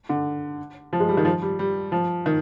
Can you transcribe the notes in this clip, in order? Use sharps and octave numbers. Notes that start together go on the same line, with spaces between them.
D3
F3
G#3
G3
D#3
F3
G3
G3
F3
D#3